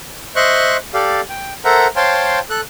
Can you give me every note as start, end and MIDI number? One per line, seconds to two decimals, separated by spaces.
0.36 0.77 72
0.36 0.77 75
0.36 0.77 76
0.36 0.77 84
0.36 0.77 85
0.36 0.77 90
0.94 1.21 67
0.94 1.21 69
0.94 1.21 74
0.94 1.21 77
1.30 1.53 79
1.65 1.87 69
1.65 1.87 70
1.65 1.87 72
1.65 1.87 76
1.65 1.87 78
1.65 1.87 82
1.96 2.39 72
1.96 2.39 73
1.96 2.39 77
1.96 2.39 79
1.96 2.39 81
1.96 2.39 84
2.50 2.61 69
2.50 2.61 90